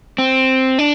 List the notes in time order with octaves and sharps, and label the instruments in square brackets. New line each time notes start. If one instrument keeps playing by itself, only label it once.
[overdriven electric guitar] C4
D4